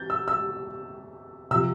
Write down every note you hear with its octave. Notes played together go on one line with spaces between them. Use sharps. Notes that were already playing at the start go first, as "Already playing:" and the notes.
Already playing: E3 G6 A6
E6
E6
C3 F3 E6